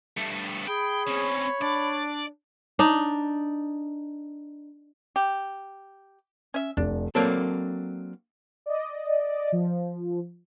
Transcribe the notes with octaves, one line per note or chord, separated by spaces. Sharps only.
G2 A3
G#4 G5 B5
C4 C#4 C#5
D4 D5
D4 D#4
G4
C#4 E5
F1 D4
F#3 A#3 C4 D4 A4
D5 D#5
F3